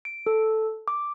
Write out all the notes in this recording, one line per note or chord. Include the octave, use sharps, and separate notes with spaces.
D7
A4
D6